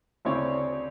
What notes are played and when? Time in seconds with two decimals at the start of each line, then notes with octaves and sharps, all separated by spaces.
0.25 D2 C#3 C4 E4 C#5 D5